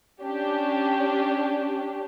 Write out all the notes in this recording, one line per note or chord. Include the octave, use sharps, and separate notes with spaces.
C#4 D4 G4